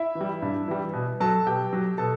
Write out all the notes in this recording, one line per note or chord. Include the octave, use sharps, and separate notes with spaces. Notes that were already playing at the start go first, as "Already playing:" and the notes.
Already playing: E4 E5
E3
G3
G2
E3 G3
B2
F#3 A4 A5
B2 G4 G5
F#3
B2 A4 A5